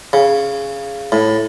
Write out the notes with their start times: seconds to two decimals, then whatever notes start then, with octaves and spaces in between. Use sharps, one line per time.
0.13 C#3
1.12 A2